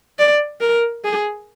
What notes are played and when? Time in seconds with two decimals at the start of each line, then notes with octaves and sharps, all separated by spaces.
0.19 D5
0.61 A#4
1.04 G#4